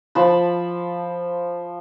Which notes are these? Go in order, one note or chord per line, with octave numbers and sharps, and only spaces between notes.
F3 A5 B5